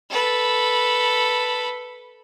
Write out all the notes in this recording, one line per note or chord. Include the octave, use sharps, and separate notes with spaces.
A4 B4